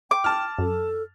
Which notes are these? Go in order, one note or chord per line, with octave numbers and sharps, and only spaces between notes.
G5 D6
A5 F6
F#2 A4